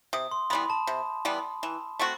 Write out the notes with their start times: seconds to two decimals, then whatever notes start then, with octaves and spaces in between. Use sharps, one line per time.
0.13 C3 D#6
0.31 C6
0.50 E3 G3 B3 B5
0.70 A5
0.87 C3
1.25 E3 G3 B3
1.63 E3
1.99 A3 C4 F#4